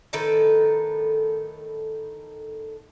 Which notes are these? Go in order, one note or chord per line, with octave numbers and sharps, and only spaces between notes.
A2 D#3 A4 B4